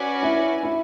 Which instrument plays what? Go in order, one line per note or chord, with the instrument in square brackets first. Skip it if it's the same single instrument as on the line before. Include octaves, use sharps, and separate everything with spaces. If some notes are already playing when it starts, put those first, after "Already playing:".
Already playing: [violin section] C#4 F#4 B4 D5 G#5
[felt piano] E4
E4